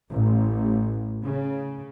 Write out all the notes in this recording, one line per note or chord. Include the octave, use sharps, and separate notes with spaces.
A1
C#3